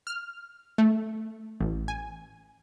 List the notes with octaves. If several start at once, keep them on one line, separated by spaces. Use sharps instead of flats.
F6
A3
A1
G#5